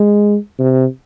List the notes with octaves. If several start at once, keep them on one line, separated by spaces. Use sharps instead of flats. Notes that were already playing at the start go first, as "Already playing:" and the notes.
Already playing: G#3
C3